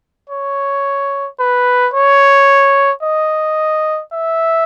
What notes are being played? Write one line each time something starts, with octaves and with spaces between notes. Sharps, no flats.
C#5
B4
C#5
D#5
E5